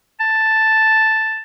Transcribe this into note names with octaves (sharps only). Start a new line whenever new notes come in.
A5